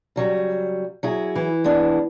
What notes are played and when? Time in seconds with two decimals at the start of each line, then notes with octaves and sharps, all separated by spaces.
0.16 C#3 F#3 G3
1.03 F#3 E4 G#4
1.36 E3
1.64 G#3 B3 D4